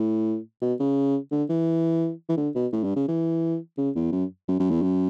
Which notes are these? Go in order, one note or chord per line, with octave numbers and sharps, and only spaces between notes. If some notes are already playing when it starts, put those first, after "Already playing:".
Already playing: A2
B2
C#3
D3
E3
E3
D3
B2
A2
G2
C#3
E3
C#3
E2
F#2
F#2
F#2
E2
F#2